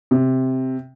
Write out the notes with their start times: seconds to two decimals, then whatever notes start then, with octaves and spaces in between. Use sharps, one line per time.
0.11 C3